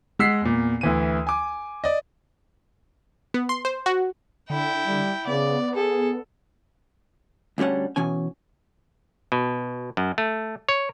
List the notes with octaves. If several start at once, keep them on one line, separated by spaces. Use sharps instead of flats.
G#3 F#5 E6 B6 C7
E2 A#2
D2 E3 D#7
G#5 D6
D5 D#5
B3
C6
C5
F#4
D3 E4 G5
G3
C#3 B3 D5
G#4 A4
D2 D3 G3 C#4 F#5
B2 E3 C#4 G#5
B2
F#2
A3
C#5